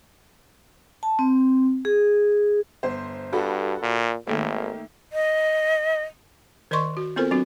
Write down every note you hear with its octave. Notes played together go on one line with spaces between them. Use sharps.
A5
C4
G#4
G1 C5
G2 F#4 A4 B5
A#2
G#1 D#3 A3 A#3
D#5
D#3 A#4 D5 D#5 C6 C#6
F#4
B3 C4 F4 A4 A#4 C5
F#3 C4 D4 F#4